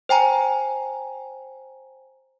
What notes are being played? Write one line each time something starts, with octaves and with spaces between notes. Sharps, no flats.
C5 G5 G#5 A#5